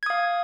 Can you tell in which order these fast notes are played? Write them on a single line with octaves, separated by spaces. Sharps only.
G#6 D#6 F5